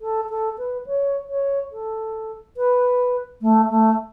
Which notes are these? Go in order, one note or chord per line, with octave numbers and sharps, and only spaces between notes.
A4
A4
B4
C#5
C#5
A4
B4
A3
A3